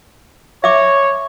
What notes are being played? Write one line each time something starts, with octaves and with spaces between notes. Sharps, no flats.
C#5 E5 D6